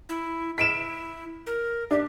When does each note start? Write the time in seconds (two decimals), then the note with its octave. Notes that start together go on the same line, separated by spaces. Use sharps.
0.09 E4
0.58 E4 B6 D7 E7
1.46 A#4
1.91 D4 G4